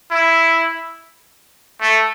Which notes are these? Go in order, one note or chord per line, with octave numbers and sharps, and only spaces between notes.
E4
A3